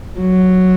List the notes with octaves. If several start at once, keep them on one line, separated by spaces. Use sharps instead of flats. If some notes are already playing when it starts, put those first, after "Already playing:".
F#3